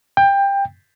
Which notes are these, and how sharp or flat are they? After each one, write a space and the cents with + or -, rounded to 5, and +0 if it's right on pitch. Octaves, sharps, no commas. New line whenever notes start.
G5 +20